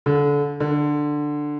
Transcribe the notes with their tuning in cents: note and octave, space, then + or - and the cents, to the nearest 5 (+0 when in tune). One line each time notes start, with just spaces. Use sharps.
D3 -25
D3 +10